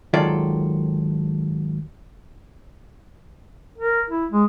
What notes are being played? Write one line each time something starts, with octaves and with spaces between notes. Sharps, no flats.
G#2 D#3 F#3 F4 A4 D5
A#4
E4
G#3